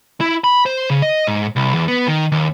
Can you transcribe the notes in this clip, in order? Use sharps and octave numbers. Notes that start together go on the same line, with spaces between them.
E4
B5
C5
C#3
D#5
G#2
C2
E2
B3
D#3
D#2